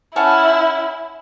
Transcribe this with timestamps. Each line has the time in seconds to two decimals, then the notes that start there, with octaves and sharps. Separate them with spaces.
0.16 C#4 E4 F#5 A5